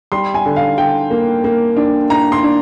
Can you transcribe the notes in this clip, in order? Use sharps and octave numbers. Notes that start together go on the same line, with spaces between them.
G3 C6
G#5
D3
F5
D3 G5
A#3
A#3
D4
D4 A#5
C6
D4